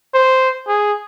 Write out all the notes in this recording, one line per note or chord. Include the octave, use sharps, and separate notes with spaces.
C5
G#4